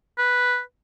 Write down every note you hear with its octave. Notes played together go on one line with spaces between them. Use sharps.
B4